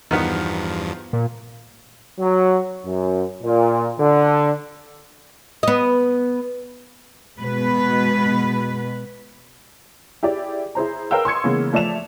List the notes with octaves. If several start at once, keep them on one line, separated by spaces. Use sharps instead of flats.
E2 G2 D#3 F3 B3
A#2
F#3
F#2
A#2
D3
B3 D#5
B2 G#3 B4
E4 G4 G#4 D5
E4 G#4 C5 A#5
A#4 B4 F5 G5 E6
C6 C#6 D#6 G#6 C#7
C#3 E3 G#3 A#3 B3
F3 A3 D5 E5 E7 F7